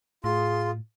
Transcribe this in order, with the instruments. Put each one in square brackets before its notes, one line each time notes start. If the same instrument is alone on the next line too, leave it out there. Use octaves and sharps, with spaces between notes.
[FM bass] A2 [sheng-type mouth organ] F4 [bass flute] G#4 [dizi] C6